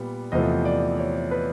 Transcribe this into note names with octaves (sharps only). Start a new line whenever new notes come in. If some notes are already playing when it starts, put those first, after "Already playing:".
Already playing: A#2 G3 B3
E2 C3 F3 A3 D#5
D5
C#5
B4